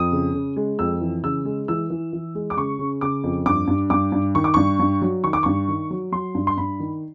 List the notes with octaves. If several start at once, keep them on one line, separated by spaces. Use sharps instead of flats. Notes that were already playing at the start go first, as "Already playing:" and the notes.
Already playing: F2 D#6
C#3
C#3
G#3
F2 E6
E3
C#3 E6
G#3
E3 E6
E3
E3
G#3
D6
C#3 C#6
C#3
C#3 D6
F2
G2 D6
G2
G2 D6
G2
D#3 C#6
D6
G2 C#6
G2
F#3
D#3 C#6
D6
G2 C#6
D#3
F#3
F#3 C6
G2
C6
G2 B5
D#3